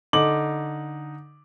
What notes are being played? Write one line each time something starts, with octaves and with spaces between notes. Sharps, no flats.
D3 D#4 D6 F#7